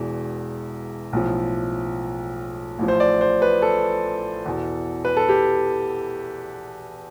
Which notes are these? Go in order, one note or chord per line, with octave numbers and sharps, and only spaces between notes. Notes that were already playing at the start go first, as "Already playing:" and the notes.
Already playing: E1 E2 B2
B1 A2 F3
A1 A2 F3
C5
D5
C5
B4
A4
E2 B2
B4
A4
G4